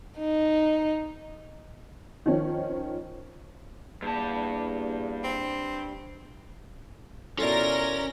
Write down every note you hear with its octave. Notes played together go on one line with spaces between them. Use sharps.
D#4
D#3 F3 C#4
E2 G2 A#3 A5
C4
B2 C#4 E4 F4 A4 A#4 D5 A#6